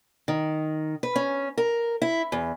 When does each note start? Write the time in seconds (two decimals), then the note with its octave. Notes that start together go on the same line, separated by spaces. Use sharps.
0.28 D#3
1.03 B4
1.16 C#4
1.58 A#4
2.02 E4
2.32 E2